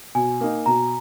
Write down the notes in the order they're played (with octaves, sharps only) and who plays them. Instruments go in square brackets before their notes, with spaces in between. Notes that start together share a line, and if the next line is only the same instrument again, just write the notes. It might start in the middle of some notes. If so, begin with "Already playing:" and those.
[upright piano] B2 [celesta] G#5
[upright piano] A#3 D#4
[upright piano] B2 [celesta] A#5